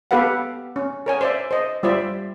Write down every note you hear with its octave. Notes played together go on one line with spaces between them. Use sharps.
B3 G4 A4 B4 F5 F#5
C#4
A#4 C#5 G#5
C5 D5 E5
C5 D#5
G3 F4 C5 D5 E5